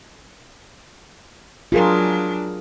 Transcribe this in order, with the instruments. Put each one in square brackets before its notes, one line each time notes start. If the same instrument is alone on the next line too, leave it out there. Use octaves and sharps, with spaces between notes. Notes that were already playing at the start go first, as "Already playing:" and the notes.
[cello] F#3 D4 [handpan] F4 G#4 A#4